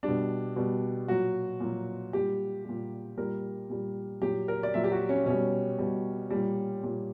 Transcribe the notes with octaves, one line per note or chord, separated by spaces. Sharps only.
G3 D4
B2
B2 G3
A#2 F#3 F#4
A#2 F#3
A#2 G3 G4
A#2 G3
A#2 G3 A#4
A#2 G3
A#2 F#3 G4
A#4
D5
A#2 F#3 E5
G4
F#4
C#4
B2 G3 C#4
B2 G3
A#2 G3
A#2 G3